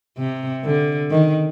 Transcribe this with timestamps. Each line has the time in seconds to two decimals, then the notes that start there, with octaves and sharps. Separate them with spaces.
0.18 C3
0.64 D3
1.10 D#3